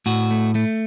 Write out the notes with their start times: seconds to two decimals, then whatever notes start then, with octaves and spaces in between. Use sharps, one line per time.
0.06 A2 F#4
0.31 A3
0.55 A3